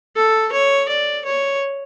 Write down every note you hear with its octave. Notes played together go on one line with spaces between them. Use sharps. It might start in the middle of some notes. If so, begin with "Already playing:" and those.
A4
C#5
D5
C#5